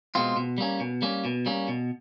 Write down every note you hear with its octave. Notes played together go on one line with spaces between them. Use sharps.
B2 G#3 C4 F4
B2
G3 A#3 C#4
B2
G3 A#3 C#4
B2
G3 A#3 C#4
B2